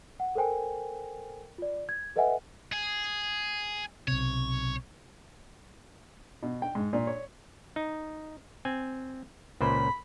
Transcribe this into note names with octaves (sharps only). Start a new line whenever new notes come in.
F#5
A4 A#4 C5 G5 G#5
F4 D5
G#6
A4 B4 D#5 E5 F#5 G#5
G#4
B1 C3 C#5
B2
G5
G#2
A#2
C#5
D#4
C4 G#5
C#2 A#2 C5 B5